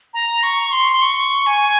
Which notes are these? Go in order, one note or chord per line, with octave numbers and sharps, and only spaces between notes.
A#5
C#6
C6
C#6
G#5